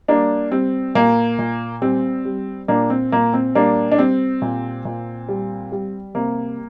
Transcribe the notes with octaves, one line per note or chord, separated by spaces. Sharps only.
G3 A#3 D4
G3 C4
A#2 A#3
A#2
G3 C4
G3
A#2 A#3 D4
C4
A#2 A#3
C4
G3 A#3 D4
D4
G3 C4
A#2
A#2
G3
G3
C3 A#3